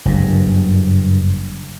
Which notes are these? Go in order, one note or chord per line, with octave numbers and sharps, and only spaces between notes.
F#1 G2